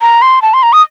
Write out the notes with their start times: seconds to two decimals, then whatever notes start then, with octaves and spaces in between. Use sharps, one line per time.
0.01 A#5
0.22 C6
0.42 A5
0.54 C6
0.63 A#5
0.73 D#6